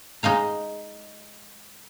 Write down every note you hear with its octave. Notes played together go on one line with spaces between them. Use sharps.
G#3 D#4 D#5 F5 A#5